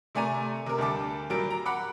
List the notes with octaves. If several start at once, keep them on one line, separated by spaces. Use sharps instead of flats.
C3 A3 D5 G#5 A#5 D#7
C3 A#4
D2 G3 A5 D6
A#2 F#3 G3 D7
A#5
F#5 B5 D6